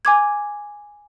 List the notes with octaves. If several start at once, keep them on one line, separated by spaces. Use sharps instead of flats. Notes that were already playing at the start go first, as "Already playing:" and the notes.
G#5 D6 G#6